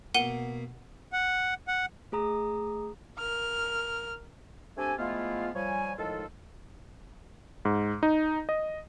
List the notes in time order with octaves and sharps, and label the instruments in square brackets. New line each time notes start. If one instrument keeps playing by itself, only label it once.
[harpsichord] B2 A#3 [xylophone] F#5 D#7 G7
[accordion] F#5
F#5
[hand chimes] A3 G#4 A#5 D#6
[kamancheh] A#4 F6
[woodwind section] A3 C4 D4 G4 A4 G#5
F3 G#3 A3 B3 E4 F4
F3 G3 C#5 G#5
A2 D#3 F3 G#3 F4 A4
[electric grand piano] G#2
D#4
D#5